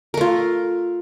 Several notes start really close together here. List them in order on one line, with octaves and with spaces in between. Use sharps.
A#4 A3 F4